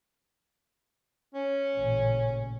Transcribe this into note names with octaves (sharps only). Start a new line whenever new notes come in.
C#4
A1 A#2 C#3